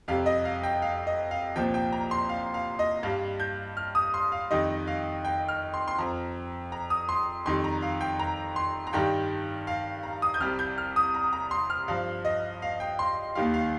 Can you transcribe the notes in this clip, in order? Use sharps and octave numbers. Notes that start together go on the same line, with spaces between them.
F2 C3 G3 F5
D#5
F5
G5
F5
D#5
F5
C2 A#2 F3 G5
G5
A#5
C6
F5
F5
D#5
G2 G3 F5
G6
F6
D#6
C6
F5
F2 D#3 G3 D#5
F5
G5
F6
C6
C6
F2 F3 A#5
A#5
D#6
C6
F2 D#3 G3 C6
A#5
F5
G5
A#5
C6
A#5
G2 D#3 G3 G5
F5
A#5
D#6
G6
C2 C3 G3 F6
G6
F6
D#6
A#5
A#5
C6
F6
G2 F3 F5
D#5
F5
G5
C6
D#2 D#3 G3 F5
F5